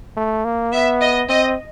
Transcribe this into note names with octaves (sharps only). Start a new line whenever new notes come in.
A3
A#3
B3 E5
D#5
C4 D#5